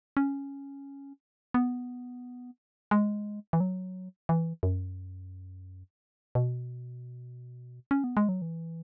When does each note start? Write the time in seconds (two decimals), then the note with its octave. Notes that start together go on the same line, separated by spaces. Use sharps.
0.17 C#4
1.54 B3
2.91 G#3
3.53 E3
3.60 F#3
4.29 E3
4.63 F#2
6.35 B2
7.91 C#4
8.04 B3
8.17 G#3
8.29 F#3
8.42 E3